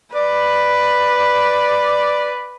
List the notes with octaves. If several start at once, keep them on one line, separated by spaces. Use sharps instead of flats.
B4 D5